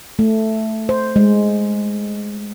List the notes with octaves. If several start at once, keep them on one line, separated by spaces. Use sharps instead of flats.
A3
C5
G#3